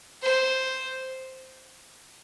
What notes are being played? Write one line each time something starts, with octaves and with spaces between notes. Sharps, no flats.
C5